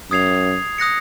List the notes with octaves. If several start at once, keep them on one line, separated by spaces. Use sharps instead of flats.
F#2 D#6 G#6 C7 F7
D#6 F#6 A#6 C#7